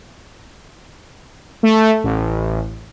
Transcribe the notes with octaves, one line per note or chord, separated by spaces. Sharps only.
A3
A1